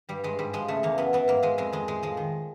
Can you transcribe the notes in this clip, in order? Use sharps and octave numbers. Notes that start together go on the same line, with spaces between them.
G2 G3
G2 G#3
G#2 G3
F3 G#3
C#3 A3
E2 A#3
F#2 B3
E3 B3
G#2 A#3
G#2 G#3
F2 G#3
F2 G#3
A2 G#3
F3 G#3
D#3